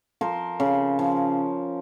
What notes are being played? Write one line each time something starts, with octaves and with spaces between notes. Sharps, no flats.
F3 A#4 C5
C#3
F3